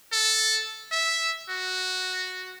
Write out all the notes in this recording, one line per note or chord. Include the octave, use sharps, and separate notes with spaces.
A4
E5
F#4